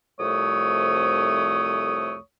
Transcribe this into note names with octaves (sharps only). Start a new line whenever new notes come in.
C2 F2 A3 C#5 D#6